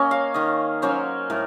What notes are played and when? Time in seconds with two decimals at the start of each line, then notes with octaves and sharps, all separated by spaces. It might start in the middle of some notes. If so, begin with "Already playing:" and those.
Already playing: A#3 C#4 C#5 D#5
0.11 F5
0.34 D#3 D#5
0.82 F#3 A#3 C#4 C5
1.30 A2 A#4